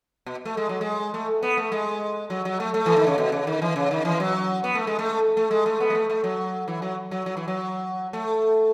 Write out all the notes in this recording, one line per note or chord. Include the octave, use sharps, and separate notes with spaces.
B2
A3
G#3
F#3
G#3
A3
B3
A3
G#3
F#3
F#3
A3
A3
E3
D#3
C#3
B2
C#3
D#3
E3
C#3
D#3
E3
F#3
B3
A3
G#3
A3
A3
G#3
A3
B3
G#3
A3
A3
F#3
E3
F#3
F#3
F#3
E3
F#3
A3